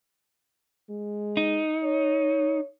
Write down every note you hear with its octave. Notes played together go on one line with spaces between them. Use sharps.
G#3
D#4
C#5